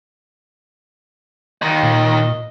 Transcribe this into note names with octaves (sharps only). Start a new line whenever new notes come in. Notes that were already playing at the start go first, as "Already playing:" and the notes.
D#2 D#3 D#5
A#2